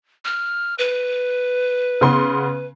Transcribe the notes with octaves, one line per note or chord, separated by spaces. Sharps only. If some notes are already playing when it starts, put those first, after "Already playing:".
F6
B4
C#3 B3 C6